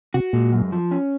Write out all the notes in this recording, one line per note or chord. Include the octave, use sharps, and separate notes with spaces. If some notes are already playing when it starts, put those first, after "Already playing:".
C3 F#4
A#2 G#3
F#2
F3
C#4